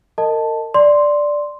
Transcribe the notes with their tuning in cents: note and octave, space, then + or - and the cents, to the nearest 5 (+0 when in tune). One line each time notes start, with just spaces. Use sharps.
A#4 -40 D#5 +0 A5 +0
D5 +0 C6 +0